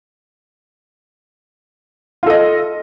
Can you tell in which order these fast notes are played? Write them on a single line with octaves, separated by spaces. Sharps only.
F4 A4 D#5